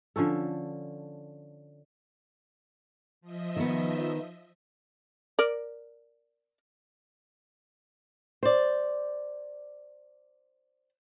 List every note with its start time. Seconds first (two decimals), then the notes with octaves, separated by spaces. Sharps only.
0.16 D3 F3 C#4 A4
3.21 F3 D#5 E5
3.56 D#3 B3
5.39 A#4 D5
8.43 C5 D5